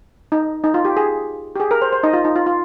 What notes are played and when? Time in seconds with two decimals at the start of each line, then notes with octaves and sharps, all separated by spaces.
0.32 D#4
0.64 D#4
0.74 F4
0.85 G4
0.97 G#4
1.56 G4
1.60 G#4
1.71 A#4
1.82 C5
1.93 C5
2.03 D#4 D#5
2.13 F4
2.24 D#4
2.36 F4
2.46 F4